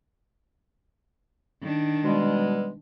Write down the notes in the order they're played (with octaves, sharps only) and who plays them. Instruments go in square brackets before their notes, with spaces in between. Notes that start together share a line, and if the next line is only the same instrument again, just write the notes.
[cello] D#3 D4
[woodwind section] B2 G3 G#3